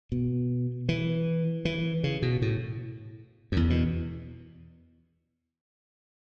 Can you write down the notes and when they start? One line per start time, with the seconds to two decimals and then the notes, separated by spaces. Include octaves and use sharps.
0.12 B2
0.89 E3
1.65 E3
2.04 C#3
2.22 B2
2.42 A2
3.52 F#2
3.57 E2
3.70 B2